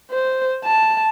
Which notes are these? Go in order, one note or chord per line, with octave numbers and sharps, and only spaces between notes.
C5
A5